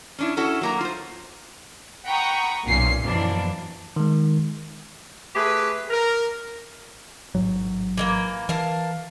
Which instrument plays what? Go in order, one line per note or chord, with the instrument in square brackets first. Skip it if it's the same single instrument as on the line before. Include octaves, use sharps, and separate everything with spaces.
[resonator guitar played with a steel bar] C#4 D4 E4
C#4 E4 F#4 A4
F#3 A#3 A#5
F4 C5
[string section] F#5 G5 A#5 B5 C#6 D#6
B1 G2 A#2 C#4 C7
F#2 B2 E3 F3 A#3 D4
[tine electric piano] D#3 G#3
[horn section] A3 G4 G#4 B4
A#4
[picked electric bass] A1 G#2 F#3
[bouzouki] E3 G#3 A#3
[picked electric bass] E3 [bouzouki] A#4 F5 A5